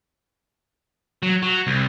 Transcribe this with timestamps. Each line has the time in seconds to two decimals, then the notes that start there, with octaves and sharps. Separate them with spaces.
1.23 F#3
1.43 F#3
1.67 C2